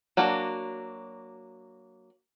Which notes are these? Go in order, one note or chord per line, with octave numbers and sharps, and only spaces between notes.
F#3 A#3 D4 F#4